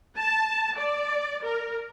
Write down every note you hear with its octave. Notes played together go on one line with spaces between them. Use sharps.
A5
D5
A#4